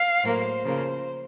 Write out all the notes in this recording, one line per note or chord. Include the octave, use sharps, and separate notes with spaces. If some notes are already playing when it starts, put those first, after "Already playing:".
Already playing: F5
A2 F#3 A#3 C5
C#3 F3 A#3